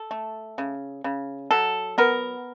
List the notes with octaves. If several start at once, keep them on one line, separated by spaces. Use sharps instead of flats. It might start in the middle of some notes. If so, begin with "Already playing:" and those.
Already playing: A4
A3
C#3
C#3
F#3 A4
B3 A#4